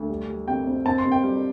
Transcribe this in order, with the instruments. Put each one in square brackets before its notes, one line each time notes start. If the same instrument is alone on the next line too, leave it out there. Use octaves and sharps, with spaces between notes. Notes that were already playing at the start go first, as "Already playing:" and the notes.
Already playing: [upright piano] D2
G3
G3
C3 G5
C4
C4 A5
C6
C3
G5
G3